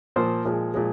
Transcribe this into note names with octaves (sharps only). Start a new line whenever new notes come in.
A#2 F3 A#3 C5
A#2 F3 G#3
A#2 F3 G#3